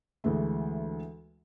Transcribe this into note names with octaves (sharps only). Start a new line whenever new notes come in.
D2 E3 G#3 A3